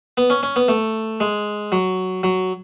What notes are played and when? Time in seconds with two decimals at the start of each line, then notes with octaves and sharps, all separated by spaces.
0.17 B3
0.30 C#4
0.43 C#4
0.56 B3
0.68 A3
1.20 G#3
1.72 F#3
2.23 F#3